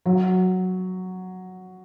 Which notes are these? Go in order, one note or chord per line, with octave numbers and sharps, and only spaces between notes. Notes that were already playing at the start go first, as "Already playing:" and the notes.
F#3